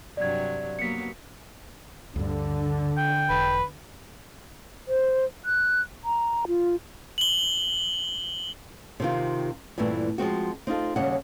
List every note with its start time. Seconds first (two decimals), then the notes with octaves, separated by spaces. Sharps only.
0.17 G2 C3 F#3 D5 G#6
0.79 F#3 A#3 B3 B6 C#7
2.16 D2 G2 D3
2.98 G5
3.30 E1 B4
4.88 C5
5.45 F#6
6.04 A#5
6.47 F4
7.18 F#7 G7
9.00 C3 D#3 F4
9.78 G2 A#2 E3 A3 C4
10.18 F3 G#3 C4 F#4
10.67 C4 D#4 F4 A4
10.96 D#2 C#3 G3 F#5